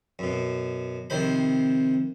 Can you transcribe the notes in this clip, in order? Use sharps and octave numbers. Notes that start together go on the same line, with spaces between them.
F#2 B2
F2 C3 D#3 C5 B5